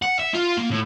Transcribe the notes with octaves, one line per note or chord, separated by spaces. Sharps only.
F#5
E5
F4
A#3
A2